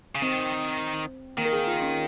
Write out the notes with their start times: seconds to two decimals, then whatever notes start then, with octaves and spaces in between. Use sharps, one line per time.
0.15 C#3
0.22 D#3 C4
1.38 D#3 A#3
1.45 A#4
1.52 G#4
1.67 F4
1.82 C#4